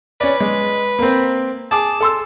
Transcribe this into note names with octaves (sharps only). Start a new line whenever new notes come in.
C#4 B4 D5
G#3
A#3 C4
G#4 A5 D6
A4 C6 E6